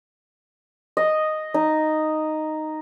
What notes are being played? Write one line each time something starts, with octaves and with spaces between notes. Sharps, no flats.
D#5
D#4